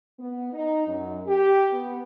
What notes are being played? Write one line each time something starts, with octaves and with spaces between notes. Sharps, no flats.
B3
D#4
F#2
G4
B3